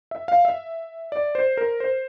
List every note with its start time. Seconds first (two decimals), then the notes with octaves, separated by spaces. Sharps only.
0.11 E5
0.28 F5
0.45 E5
1.12 D5
1.35 C5
1.57 A#4
1.80 C5